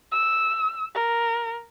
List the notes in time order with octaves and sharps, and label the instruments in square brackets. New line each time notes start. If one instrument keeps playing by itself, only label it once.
[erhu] E6
A#4